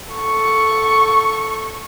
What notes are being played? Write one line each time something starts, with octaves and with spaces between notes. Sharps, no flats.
A4 C#6